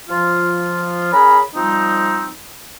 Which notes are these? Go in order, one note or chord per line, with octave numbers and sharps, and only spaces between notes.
F3 F4
C#4 G#4 A#4 B5
F3 G3 C4 D#4